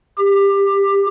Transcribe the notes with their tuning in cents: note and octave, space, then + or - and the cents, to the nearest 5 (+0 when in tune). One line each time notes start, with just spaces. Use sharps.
G4 +20